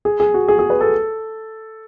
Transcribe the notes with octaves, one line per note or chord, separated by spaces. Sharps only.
G#4
G#4
F#4
G#4
G#4
B4
A4